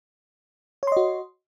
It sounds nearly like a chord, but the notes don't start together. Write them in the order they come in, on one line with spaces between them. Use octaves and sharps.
C#5 C6 D#5 F#4